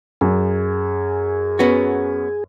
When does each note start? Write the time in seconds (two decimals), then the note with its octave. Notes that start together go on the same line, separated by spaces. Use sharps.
0.21 F#2 G#4
1.59 B3 C#4 F#4